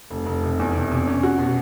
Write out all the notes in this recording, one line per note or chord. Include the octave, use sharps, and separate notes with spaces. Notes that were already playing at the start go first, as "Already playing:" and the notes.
F1
F1
C3
E2
C3
C3
C#4
F#4
B2